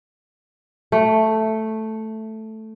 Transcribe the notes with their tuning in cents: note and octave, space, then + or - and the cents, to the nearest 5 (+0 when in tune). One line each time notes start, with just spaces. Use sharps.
A3 +0